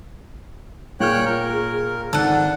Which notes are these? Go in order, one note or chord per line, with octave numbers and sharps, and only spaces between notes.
A#2 G#4 C#5 G5 F6 F#6
A#4
G#1 D4 A4 F#5